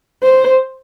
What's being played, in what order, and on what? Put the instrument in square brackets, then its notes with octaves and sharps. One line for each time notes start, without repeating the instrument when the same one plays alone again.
[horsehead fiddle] C5